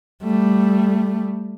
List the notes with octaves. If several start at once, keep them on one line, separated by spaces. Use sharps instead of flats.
G3 A3